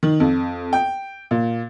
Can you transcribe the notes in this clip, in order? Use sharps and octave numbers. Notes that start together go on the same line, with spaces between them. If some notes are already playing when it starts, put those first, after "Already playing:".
D#3
F2
G5
A#2